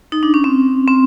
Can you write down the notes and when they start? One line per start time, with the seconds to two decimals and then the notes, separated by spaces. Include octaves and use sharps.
0.12 D#4
0.23 D4
0.34 C#4
0.44 C4
0.88 C4